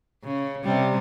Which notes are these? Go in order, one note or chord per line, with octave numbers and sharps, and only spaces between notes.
C#3
C3 G3